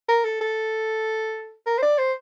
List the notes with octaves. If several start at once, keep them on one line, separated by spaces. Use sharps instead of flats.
A#4
A4
A4
A#4
C5
D5
C5